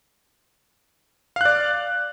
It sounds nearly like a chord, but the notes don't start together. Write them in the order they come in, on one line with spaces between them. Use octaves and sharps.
F5 F#6 D5